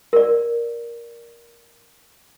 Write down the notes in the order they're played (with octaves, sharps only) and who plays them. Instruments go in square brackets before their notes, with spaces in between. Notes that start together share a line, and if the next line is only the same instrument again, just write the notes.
[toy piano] A#4 D5